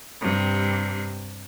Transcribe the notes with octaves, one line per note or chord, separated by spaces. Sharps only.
G2 C3